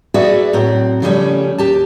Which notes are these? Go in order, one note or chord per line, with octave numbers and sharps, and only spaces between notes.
F#4 G#4 A4 B4 D5 E5
A2 F#3 C4
C#3 F3 G3 A3 C#4
D#2 G4 A5